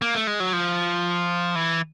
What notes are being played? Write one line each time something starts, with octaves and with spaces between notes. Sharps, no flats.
A#3
A3
G#3
F#3
F3
E3